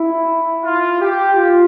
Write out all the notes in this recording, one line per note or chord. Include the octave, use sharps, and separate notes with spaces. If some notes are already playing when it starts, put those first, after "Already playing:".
Already playing: E4
F4
G4
F4